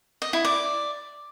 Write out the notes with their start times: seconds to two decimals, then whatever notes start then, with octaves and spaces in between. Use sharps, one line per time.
0.22 D#5
0.33 E4
0.45 D5